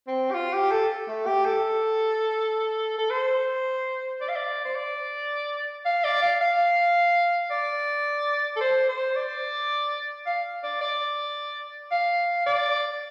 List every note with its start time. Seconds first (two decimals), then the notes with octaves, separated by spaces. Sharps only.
0.07 C4
0.31 G4
0.34 F4
0.53 G4
0.71 A4
1.08 A3
1.26 G4
1.45 A4
2.98 A4
3.10 C5
4.21 D5
4.29 F5
4.36 D5
4.65 C5
4.75 D5
5.85 F5
6.04 D5
6.22 F5
6.40 F5
7.50 D5
8.56 A4
8.61 C5
8.88 C5
9.16 D5
10.26 F5
10.63 D5
10.81 D5
11.92 F5
12.46 D5